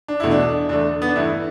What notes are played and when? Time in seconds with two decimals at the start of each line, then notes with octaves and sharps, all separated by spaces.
0.08 D4
0.20 E2 B2 A3 E4
0.31 D4
0.69 E2 D3 A3 D4
1.02 B3
1.08 D4
1.16 G2 E3 A3 E4